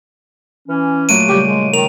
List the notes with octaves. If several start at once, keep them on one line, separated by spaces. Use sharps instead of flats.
E3 C#4
A#2 F#3 A3 D7 D#7
C#3 G3 G4
G#3
D#3 F7